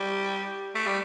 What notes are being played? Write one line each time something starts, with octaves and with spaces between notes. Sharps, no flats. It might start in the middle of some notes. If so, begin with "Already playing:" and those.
Already playing: G3
A3
G3